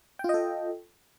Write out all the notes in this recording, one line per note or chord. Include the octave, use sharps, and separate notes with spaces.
F4 A4 D#5 G5